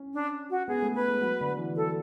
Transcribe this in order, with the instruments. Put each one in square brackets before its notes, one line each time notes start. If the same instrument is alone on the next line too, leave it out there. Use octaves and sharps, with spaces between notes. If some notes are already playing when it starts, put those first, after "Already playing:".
Already playing: [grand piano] C#4
[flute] D4
F#4
[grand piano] B3 [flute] G#4
[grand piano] A3
[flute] B4
[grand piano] G#3
F#3
D3
E3
E3
[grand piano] F#3 [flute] A4